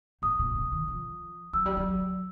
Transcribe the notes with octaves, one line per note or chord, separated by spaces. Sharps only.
A2 D#6
A#2
B2
D#3
F3
F#3 E6
G3
F#3